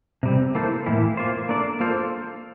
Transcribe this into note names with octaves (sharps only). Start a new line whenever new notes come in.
C3 G3 C4
A#3 E4 A4 C5
A2 E3 A#3 E4
A#3 F4 C5
A#3 D4 A4 D5
A#3 F4 A4 C5